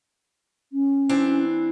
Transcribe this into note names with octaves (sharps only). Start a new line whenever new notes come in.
C#4
E3 C4 D4